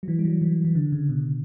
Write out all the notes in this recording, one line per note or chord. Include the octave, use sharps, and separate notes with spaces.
F#3
E3
G3
F#3
E3
E3
D3
C#3
B2